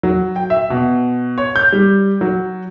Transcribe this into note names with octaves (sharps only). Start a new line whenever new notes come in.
F#3
G5
E5
B2
C#5
G6
G3
F#3